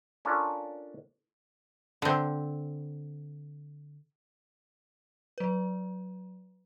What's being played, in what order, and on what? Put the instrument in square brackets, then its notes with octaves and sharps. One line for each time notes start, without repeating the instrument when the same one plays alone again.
[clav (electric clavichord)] C#4 D4 F4 A4 A#4
[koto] D3 C4
[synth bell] F#3 B4